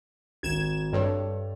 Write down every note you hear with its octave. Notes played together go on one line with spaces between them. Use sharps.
G#1 G#6 E7
G2 A4 C#5 D5